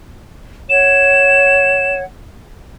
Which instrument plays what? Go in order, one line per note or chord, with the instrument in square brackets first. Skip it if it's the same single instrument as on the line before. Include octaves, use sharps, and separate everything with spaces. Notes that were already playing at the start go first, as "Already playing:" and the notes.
[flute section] C#5 F#5 [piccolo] E7